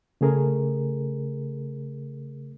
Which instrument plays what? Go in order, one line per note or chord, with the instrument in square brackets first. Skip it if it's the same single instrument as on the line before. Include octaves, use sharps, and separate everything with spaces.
[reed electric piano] C#3 A3 G#4 A#4